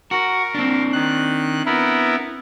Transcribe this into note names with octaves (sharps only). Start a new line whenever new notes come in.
F#4 A#4
C4 D4
D#3 F#6
B3 E4 A#4